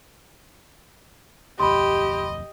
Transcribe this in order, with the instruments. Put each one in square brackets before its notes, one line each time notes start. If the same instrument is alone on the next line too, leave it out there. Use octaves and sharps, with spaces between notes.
[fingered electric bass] D1 B1 F2 [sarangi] G4 [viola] D#5 [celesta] B5 C6